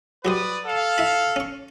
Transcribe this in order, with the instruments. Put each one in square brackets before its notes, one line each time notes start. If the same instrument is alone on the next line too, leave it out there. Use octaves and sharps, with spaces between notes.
[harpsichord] F#3 G4 C5 [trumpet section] B4 D5 D#6
[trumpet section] A4 F5
[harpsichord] E4 B5
C#4 C#6